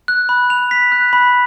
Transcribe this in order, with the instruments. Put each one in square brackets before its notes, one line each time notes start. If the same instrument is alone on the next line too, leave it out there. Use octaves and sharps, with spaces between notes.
[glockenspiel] F#6
B5
F7
B6
F#6
B5